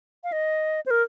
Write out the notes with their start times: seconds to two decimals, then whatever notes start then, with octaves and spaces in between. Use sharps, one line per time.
0.24 F5
0.32 D#5
0.86 C5
0.91 A#4